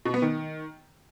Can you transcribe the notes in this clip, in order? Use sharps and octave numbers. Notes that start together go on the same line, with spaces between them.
B2
B3
D#3